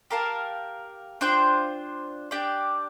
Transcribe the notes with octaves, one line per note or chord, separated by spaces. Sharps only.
G4 A#4 F5 A5
D4 F4 C5 G5
D4 G4 D5 G5